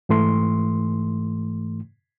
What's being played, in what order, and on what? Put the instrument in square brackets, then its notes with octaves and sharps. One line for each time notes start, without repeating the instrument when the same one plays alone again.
[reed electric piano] G#2 E3 A3 C6